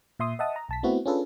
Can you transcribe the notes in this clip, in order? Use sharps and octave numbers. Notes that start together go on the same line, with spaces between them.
A#2 E5 C6 D#6
D#5 E5 F#5 A5 D#6
A#5
B1 A5 B6
A3 B3 C4 E4 F#4
C#4 D4 F4 G#4 A4 B4